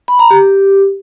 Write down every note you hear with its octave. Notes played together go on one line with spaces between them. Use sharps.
B5
A#5
G4